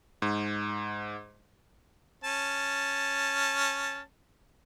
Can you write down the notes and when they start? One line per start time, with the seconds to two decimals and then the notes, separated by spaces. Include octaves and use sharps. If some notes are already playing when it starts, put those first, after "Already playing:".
0.22 G#2
2.24 C#4 A5